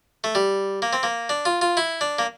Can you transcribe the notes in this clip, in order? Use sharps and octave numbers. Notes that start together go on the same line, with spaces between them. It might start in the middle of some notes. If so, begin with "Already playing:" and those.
A3
G3
A#3
C4
A#3
D4
F4
F4
E4
D4
A#3